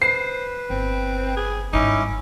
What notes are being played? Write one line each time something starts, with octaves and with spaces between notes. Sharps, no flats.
B4 C5 C7
G1 C4
G#4
G#1 G2 C#4 D#4 E4 D6